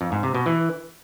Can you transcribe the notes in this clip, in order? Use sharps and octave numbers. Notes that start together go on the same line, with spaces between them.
F2
G#2
C3
B2
E3